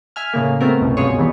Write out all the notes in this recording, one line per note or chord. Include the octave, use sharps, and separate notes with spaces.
E5 G#5 F6
A2 C#3 A#3
A3 B3 C4 F#4 A#4
C2 F#2 B2
C#2 G2 B2 F4 G#4 C#5
C#2 F#2 D#3 E3 G3 B3